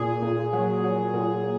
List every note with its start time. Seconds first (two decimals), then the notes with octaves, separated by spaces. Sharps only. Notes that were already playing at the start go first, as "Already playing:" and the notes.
Already playing: A#2 G#4
0.22 A#2
0.53 F#3
0.84 F#3
1.14 A#2